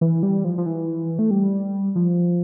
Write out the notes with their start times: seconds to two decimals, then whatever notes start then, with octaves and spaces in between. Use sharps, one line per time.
0.01 E3
0.23 G3
0.44 F3
0.58 F3
0.66 E3
1.19 A3
1.31 G3
1.95 F3